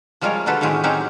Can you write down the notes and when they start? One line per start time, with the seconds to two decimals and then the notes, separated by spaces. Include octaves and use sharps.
0.21 F3 G3 G#3 F4 A#4 C#5
0.46 D3 F#3 F4 A4 B4
0.61 A2 D#3 F#3 G#3 C4 G4
0.84 F#3 C4 C#4 D#4 F#4 G4